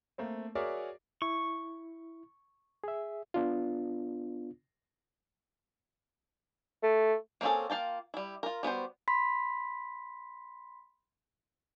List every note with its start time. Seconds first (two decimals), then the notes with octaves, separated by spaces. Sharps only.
0.18 A3 A#3 C4
0.55 F#4 G#4 A#4 C#5 D5 E5
1.22 E4 C#6
2.84 G#4 E5
3.34 B3 D4 F4
6.83 A3
7.41 A#3 C4 C#4 G#4 A4
7.70 A#3 F4 G5 A5
8.14 G3 E4
8.43 F4 A#4
8.63 G3 B3 F#4 C5
9.08 B5 C6 B6